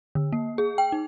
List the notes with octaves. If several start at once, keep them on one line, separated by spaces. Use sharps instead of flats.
D3
A#3
G#4
G5
D#4